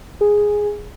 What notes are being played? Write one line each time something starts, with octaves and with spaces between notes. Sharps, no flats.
G#4